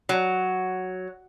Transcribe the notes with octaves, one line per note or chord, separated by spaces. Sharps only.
F#3